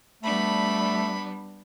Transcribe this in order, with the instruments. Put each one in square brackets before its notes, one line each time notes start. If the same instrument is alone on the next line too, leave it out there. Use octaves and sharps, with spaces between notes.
[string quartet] G3 B3 D4 [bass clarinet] A3 [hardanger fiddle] B5